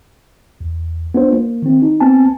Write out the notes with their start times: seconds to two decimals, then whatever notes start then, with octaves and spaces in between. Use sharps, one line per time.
0.61 E2
1.14 B3 D4 F4 C5
1.32 A#3
1.62 D#3 C4
1.82 D#4
2.00 B3 C4 G#5 A5